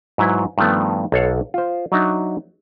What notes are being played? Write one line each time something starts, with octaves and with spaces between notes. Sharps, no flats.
G#2 F#3 E4 B4
G2 D#3 F3 A3 B3
B1 A4 C#5 F5 F#5
F4 C5
F#3 D4 D#4 F#4 E5